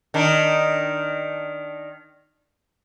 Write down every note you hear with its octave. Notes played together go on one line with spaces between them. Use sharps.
D#3 D4